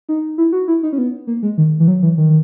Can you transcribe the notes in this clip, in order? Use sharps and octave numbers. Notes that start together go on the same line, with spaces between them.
D#4
E4
F#4
E4
D#4
C#4
B3
A#3
G#3
D#3
E3
F#3
E3
D#3